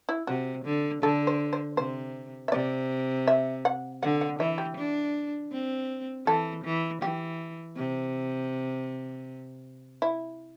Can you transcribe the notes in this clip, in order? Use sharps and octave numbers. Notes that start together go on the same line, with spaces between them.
E4
C3 F#4
D3
D3 A4
C5
C5
C3 C5
E5
C3 D5
E5
F#5
D3 F#5
F#5
E3 E5
G4
D4
C4
E3 A4
E3
E3 G4
C3
E4